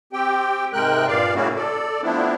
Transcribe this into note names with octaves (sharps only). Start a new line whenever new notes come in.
C4 G4 G5
G#2 C3 G#3 A#4 G5 F#6
G2 A#2 D5 F5
A2 C#3 A#3 C#4 E4 F#4
A4 D5
F3 A3 B3 C4 D4 E4